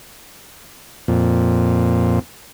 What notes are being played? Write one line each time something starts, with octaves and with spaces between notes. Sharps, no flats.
F2 A#2